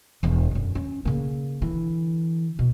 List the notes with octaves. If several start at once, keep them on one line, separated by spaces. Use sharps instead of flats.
E1 E2
F#2 D3
C#4
C#3 A#3
D3 E3
B2